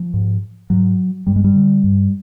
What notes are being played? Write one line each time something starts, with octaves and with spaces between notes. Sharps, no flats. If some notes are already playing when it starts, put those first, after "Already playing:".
Already playing: F3
G#2
G#2 F#3
G2 G3
G#3
G3
D3
G2